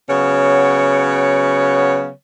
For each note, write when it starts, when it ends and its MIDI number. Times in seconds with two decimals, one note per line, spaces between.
0.10 2.11 49
0.10 2.11 54
0.10 2.11 59
0.10 2.11 73